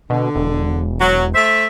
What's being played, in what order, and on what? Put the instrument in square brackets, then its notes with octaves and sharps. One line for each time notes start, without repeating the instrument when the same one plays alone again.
[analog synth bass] B2 [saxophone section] D3
[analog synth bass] E1
[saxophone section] F#3
A3 C5 E5